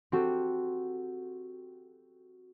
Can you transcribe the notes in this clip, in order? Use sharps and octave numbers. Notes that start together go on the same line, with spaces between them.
C4 F#4 G4 A4